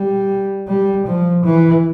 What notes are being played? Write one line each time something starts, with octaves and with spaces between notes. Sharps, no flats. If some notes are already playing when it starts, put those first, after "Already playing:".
Already playing: G3
G3
F3
E3